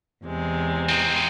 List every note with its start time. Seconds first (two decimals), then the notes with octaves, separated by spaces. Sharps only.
0.25 E2 C3 G#3
0.89 C4 D#4